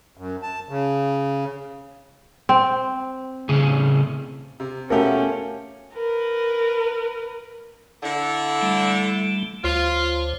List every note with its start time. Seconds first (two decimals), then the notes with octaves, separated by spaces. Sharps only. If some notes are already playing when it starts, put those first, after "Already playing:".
0.17 F#2
0.42 A5
0.69 C#3
2.49 C4
3.49 A2 C#3 G#4
4.60 C3
4.90 B2 A3 C#4 F4 G4 A#4 F#5
5.94 A#4 B4
8.03 D3 E4
8.61 G3 A3
9.64 D2 F4 C5 C#5